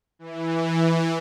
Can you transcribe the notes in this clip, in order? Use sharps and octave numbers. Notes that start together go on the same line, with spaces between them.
E3